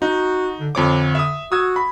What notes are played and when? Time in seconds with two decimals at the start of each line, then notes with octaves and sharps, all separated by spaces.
0.02 D#4 F#4
0.59 D3
0.75 F2 D3 C#5 D6
1.15 E5 D#6
1.52 F#4 D#6 E6 G#6
1.76 B5